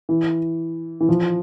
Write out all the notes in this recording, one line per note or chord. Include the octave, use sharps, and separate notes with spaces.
E3
E3
F3